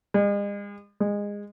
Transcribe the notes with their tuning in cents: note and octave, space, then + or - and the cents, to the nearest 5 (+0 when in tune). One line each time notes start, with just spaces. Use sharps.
G#3 -40
G#3 -20